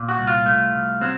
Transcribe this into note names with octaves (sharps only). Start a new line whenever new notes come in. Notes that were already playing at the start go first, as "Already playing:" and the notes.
Already playing: A#2
F#4
C2
F4
A3
C2
F#3 C4